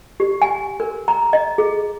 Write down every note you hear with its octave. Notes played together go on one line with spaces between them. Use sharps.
G4
G#5
A#4
A#5
D#5
G#4